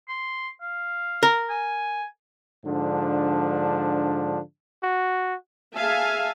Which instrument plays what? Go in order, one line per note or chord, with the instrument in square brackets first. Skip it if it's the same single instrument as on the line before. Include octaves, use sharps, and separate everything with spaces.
[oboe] C6
F5
[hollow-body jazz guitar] A#4
[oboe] G#5
[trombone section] G#2 D3 F3 D4
[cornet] F#4
[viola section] G#4 E5 F5 G#5 A5